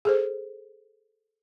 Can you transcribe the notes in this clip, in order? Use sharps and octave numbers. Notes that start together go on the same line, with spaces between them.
G#4 A4 C5